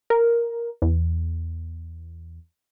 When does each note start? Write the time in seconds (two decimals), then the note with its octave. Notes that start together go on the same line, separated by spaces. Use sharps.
0.10 A#4
0.82 E2